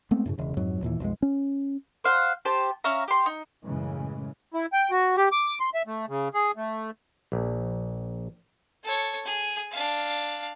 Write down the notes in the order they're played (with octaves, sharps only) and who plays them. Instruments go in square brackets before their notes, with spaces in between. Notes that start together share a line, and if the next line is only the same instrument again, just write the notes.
[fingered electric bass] G#3 A3 B3 C4
F#2 A2 C#3
E1 E2 C#3
F2 G#2 F#3
D#2 A#2 E3
B1 F2 D#3 G#3
C#4
[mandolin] C5 F5 F#5
G4 C5 A5
C#4 E5 F5 A#5
G4 C6
D#4
[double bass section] F#2 A2 C#3 E3 G#3
[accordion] E4
G5
F#4
G4
D6
C6
E5
A3
C#3
G#4
A3
[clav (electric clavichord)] A#1
[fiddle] A4 C#5
G#4
D4 F5